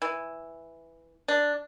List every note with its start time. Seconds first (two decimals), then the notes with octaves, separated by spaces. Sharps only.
0.02 E3
1.28 D4